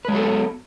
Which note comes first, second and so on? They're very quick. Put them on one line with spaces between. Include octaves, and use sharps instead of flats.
B4 G#3 F#3 A4 B3